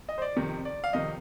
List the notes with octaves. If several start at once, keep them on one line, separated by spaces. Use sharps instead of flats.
D#5
C5
D5
F2 C3 D#3
D5
F5
F2 C3 D#3 D#5